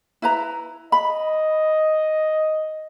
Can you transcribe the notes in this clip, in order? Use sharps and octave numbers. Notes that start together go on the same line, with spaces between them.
E4 B4 A#5
D#5 B5